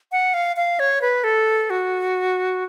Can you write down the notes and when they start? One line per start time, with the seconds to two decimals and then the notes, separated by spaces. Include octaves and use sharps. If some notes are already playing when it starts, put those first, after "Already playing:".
0.12 F#5
0.34 F5
0.57 F5
0.79 C#5
1.01 B4
1.24 A4
1.70 F#4